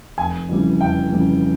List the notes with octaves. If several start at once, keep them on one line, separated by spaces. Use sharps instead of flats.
F1 G#5
F2 C#3 E3 G3
F1 G5
F2 C#3 E3 G3